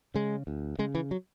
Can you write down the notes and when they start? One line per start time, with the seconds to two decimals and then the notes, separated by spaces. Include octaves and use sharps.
0.14 C#3 G#3
0.47 D2
0.79 C#3 G#3
0.95 E3
1.11 F#3